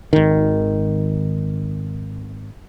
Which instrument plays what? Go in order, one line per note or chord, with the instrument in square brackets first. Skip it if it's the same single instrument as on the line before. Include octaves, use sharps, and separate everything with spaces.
[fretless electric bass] G#1 D#3